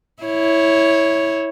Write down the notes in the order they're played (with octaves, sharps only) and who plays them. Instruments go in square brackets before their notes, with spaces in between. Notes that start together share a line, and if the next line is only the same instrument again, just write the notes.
[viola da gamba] E4 C#5